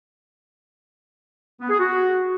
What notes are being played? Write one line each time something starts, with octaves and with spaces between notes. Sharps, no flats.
B3
G#4
F#4